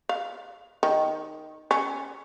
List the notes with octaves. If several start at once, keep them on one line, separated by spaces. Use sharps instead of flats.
F5
D#3
C#4